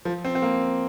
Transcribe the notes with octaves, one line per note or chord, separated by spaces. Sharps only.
F3
C4
C4
A#3